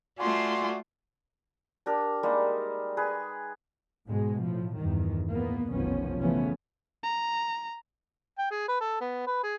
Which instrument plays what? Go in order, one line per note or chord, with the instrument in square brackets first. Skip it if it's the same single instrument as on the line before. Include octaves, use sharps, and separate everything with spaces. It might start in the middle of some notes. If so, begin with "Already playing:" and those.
[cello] A3 F4 [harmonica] F#4 D5 [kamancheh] G#5 C6
[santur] D4 G4 A#4
G3 G#3 A#3 D#4
G#4 B4
[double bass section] G#2 B2 G#3
A2 F3
E2 G2 D#3
E2 A2 A#3 B3
F1 B1 D#3 F3 B3 C#4
C#3 E3 F3 A3 B3 C#4
[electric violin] A#5
[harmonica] G5
G#4
B4
A4
B3
B4
G#4